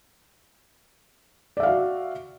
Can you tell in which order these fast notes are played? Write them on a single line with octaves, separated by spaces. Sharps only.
D5 E5 F5 F#4